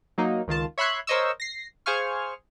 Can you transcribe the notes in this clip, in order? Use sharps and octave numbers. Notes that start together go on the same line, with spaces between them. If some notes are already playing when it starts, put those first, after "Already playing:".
F#3 A#3 D#4
C#2 D#3 F4 A5
C#5 E5 B5 C6 F#6 G#6
A#4 C5 C#5 D#5 C#6 E6
A#6 C7
G#4 C5 F5 G#5 C#6 F6